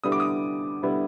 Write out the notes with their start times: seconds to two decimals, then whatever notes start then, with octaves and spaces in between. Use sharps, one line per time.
0.04 D3 G3 B3 E4 D#6
0.12 D6
0.20 D#6
0.83 D3 G3 B3 E4